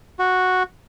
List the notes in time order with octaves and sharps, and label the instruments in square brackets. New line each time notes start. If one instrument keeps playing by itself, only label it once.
[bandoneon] F#4